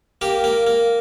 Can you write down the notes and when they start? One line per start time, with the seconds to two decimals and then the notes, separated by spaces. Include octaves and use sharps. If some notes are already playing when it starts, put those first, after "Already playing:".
0.21 A#3 G4
0.44 A#3
0.67 A#3